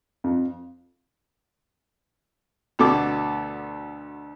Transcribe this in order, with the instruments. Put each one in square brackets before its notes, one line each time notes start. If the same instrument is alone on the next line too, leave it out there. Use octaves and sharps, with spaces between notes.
[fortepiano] F2
D2 B2 A4 D6